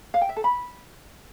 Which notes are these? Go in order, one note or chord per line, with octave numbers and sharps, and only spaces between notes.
F5
G5
E5
A4
B5